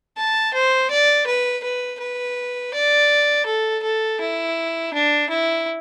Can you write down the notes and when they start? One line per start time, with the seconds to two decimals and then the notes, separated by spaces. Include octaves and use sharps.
0.17 A5
0.54 C5
0.91 D5
1.27 B4
1.64 B4
2.00 B4
2.74 D5
3.46 A4
3.83 A4
4.21 E4
4.94 D4
5.30 E4